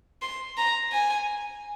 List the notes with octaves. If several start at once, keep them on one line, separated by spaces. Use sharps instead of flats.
C6
A#5
G#5